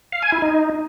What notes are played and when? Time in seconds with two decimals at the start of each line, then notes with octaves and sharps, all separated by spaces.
0.13 F5
0.22 G#5
0.32 E4
0.42 D#4